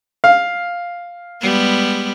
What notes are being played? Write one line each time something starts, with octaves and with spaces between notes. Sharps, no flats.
F5
G3 G#3 B3